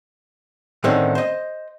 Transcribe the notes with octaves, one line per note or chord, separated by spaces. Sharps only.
A2 D3 D#3 C4 C#4 D#4
C5 D#5